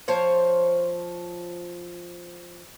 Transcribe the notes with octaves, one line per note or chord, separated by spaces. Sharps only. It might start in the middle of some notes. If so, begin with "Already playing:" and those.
F3 C5 C#5